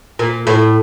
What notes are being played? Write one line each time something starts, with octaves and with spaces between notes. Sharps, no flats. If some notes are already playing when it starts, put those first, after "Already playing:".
A#2
A2